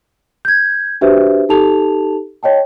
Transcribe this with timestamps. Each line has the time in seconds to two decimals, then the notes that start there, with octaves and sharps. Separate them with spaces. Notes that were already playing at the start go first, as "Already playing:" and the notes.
0.45 G6 G#6
1.01 D4 F#4 G4 B4 C5 E5
1.49 D#4 G4 A4 A5 F7
2.43 C#5 D#5 G5 A5